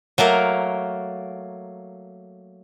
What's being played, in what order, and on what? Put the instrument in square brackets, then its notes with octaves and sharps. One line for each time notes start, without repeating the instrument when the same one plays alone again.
[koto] F#3 A3 A#3 A#4